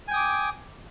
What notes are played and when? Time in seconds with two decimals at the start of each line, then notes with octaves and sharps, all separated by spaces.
0.08 G#5
0.11 G5
0.14 D#6
0.16 D6